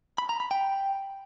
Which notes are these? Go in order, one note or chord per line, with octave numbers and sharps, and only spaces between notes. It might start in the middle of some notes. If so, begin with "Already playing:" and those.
B5
A#5
B5
G5